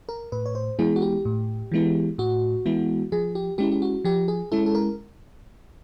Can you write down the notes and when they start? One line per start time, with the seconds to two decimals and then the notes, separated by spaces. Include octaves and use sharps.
0.09 A#4
0.32 A2 B4
0.46 C#5
0.55 C5
0.79 E3 G#3 B3 E4 G#4
0.96 F#4
1.02 G4
1.25 A2
1.72 E3 G#3 B3 E4
2.18 A2 F#4
2.66 E3 G#3 B3 E4
3.12 F3 G#4
3.35 G4
3.58 G#3 C#4 E4 G4
3.72 G4
3.82 F#4
4.05 F3 G4
4.28 G#4
4.52 G#3 C#4 E4 A4
4.66 A4
4.75 A#4